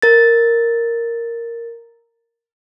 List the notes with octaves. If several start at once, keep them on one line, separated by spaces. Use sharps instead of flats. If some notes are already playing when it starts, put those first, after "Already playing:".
A#4 A6